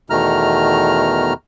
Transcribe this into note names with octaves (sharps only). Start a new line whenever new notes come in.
E2 B2 D#3 A3 A#5 F6